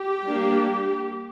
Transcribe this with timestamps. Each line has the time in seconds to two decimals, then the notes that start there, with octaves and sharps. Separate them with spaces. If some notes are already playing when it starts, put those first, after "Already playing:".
Already playing: G4
0.28 G3 A#3 D4